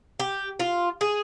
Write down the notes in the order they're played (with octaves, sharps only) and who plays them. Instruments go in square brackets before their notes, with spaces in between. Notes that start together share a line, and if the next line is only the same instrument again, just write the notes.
[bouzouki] G4
F4
G#4